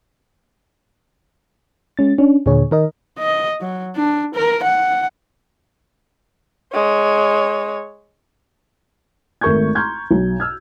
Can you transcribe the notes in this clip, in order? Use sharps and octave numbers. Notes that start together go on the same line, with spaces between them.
G#3 C#4 A6
C#4 D4
D#2 A#2 D3 G#4 C#5
D#3 A#4 D#5
D#5
F#3
D4
A#4
F#5
G#3 C#5
G#1 A3 A#4 C#6 G6 G#6
A#5 C6 C#6 F6 G6 G#6
B1
E6 F6 G#6